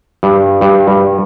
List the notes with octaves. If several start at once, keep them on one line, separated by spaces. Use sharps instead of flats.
G2
G2
G2